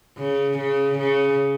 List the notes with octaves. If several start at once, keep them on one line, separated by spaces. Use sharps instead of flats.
C#3
C#3
C#3